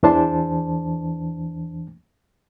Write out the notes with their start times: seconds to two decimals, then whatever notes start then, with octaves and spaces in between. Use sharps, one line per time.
0.03 E2 E3 D4 C5 A5